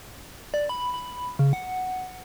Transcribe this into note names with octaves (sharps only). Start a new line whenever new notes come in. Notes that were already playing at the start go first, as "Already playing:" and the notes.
D5
B5
B5
C#3
F#5